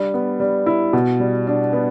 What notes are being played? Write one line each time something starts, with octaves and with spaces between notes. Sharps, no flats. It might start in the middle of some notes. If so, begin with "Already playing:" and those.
Already playing: G3 D4
B3
G3
E4
B2
G3
D4
B3